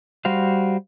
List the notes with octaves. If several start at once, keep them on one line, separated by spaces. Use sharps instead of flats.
G3 F#4 C5 F5